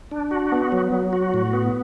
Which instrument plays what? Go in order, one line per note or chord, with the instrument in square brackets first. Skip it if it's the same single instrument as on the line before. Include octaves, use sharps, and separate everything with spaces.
[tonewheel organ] D4
F#4
B3
F#3
F#3
F#4
A2
B3